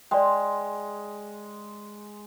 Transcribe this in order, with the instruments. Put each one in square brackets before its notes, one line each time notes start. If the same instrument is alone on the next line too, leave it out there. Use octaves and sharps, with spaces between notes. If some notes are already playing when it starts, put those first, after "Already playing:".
[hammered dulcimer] G#3 [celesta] D5 G5